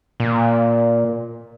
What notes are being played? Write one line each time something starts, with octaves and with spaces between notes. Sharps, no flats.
A#2